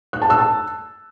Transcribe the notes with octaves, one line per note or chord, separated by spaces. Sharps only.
F#6
A5
E6
A5